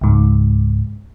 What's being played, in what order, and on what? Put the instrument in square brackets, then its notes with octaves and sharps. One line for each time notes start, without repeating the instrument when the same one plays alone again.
[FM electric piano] C#2 G#2